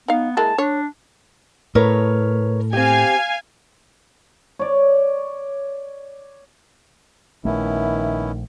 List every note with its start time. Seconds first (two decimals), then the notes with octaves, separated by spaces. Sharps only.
0.08 B3 D#4 F5
0.37 G#3 A#3 E4 A5
0.58 D4 C#5
1.75 A2 A#4 B4 C#5
2.73 C4 G4 F5 G#5
4.59 C#5 D5
7.45 A#1 D#3 A3 B3 C#4 E4 E5